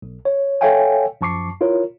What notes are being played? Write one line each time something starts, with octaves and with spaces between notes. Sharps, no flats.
B1
C#5
A4 C#5 E5 F5 G5 G#5
F#2 F3 A5 C#6 D6 C7
E4 F4 A#4 C#5